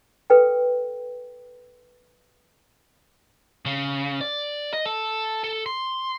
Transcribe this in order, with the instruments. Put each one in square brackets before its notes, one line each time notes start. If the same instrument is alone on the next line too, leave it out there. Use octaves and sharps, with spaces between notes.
[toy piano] A4 B4 G5
[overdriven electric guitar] C#3
D5
D#5
A4
A4
C6